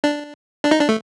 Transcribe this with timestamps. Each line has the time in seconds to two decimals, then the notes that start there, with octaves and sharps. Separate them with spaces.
0.04 D4
0.65 D4
0.71 D#4
0.80 D4
0.89 A3